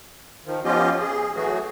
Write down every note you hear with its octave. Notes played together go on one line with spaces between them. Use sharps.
D#3 F3
F3 B3 C#4 F4 G4 D#5
G#4
E3 F#3 A3 F#4 G#4